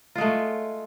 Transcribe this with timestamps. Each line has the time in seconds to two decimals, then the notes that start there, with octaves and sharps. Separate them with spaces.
0.15 F4
0.18 G#3
0.21 A3